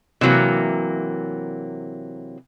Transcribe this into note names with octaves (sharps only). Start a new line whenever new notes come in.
C3 E3 F#3 A#3